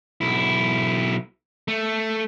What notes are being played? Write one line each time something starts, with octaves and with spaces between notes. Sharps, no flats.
B1 E4
A3